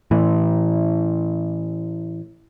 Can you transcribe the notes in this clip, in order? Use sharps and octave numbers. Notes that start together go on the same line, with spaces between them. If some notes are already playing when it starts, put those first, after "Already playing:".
A2 E3